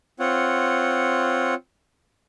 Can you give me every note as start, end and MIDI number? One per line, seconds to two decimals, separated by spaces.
0.20 1.54 60
0.20 1.54 65
0.20 1.54 73
0.20 1.54 78